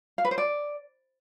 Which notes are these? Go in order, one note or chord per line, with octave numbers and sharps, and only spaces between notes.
F5
B4
C5
D5